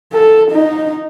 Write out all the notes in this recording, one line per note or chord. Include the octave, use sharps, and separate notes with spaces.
A4
D#4